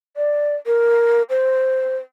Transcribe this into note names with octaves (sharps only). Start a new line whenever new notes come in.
D5
A#4
C5